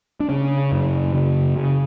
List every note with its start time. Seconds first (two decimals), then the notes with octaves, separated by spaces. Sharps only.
0.20 D4
0.29 C#3 C#4
0.72 F#2
1.14 C#3
1.56 C#3